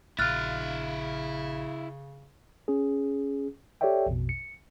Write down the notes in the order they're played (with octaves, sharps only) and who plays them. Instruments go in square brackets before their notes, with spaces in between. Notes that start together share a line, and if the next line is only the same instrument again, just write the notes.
[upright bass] A#1 [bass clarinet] C#3 [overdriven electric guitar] E4 F5 [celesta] F6 F#6 A6
[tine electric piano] C#4 G#4
G4 A4 C#5 D5 E5 G5
A#1 F2 B2
C#7